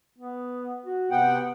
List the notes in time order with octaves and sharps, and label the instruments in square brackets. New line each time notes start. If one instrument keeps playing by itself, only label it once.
[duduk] B3
F#4
[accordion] C3 F#5 G5 [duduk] B3